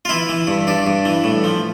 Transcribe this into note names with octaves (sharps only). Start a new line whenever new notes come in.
F4
E3 E4
E3
G2
G2 D4
G2
E3
A2
F3